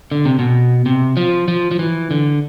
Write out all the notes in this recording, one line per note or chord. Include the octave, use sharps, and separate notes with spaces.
D3
C3
B2
C3
F3
F3
F3
E3
D3